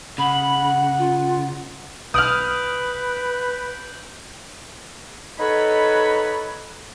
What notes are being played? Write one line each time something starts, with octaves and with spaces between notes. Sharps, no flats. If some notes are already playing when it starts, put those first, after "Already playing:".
C#3 F#5 B5
F4
B1 B4 D#6 F6 G6 D7 F#7
D#4 A4 B4 C#5 F#5 B5